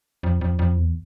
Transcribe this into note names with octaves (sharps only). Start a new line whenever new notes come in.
F2
F2
F2
E2